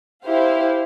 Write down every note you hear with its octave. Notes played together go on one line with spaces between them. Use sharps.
E4 G4 C5 F5